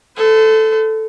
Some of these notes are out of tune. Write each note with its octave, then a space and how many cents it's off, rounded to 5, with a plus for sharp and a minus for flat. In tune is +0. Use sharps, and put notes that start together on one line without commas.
A4 +0 C5 -45